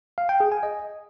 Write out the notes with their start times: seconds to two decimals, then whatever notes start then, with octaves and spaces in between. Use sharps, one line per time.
0.18 F5
0.29 G5
0.40 G#4
0.52 G#5
0.63 D#5